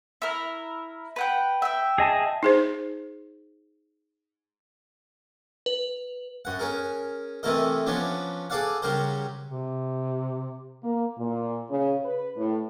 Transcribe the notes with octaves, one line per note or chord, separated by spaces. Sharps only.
E4 A#4
B4 F#5 G5
E5 G5
G#4 D#5 A5
D#4 G#4 C5
B4
F#2 F#5
C#4 G#4 A#4
C3 E3 A3 E4 A#4 D#5
F3 F#3 B3 C#4 D4
G#4 A4 D5 F5 F#5
C#3 F#3 G3 A#4 C5
C3
A#3
A#2
C#3
B4
A2